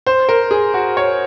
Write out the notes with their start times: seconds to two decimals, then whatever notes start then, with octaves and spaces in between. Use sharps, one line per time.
0.07 C5
0.29 A#4
0.51 G#4
0.74 F#4
0.97 C#5